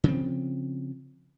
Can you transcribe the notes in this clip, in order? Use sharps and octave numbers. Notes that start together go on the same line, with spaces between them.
C#3 F3 C4